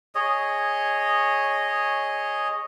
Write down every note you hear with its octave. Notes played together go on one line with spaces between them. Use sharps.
G#4 C#5 D#5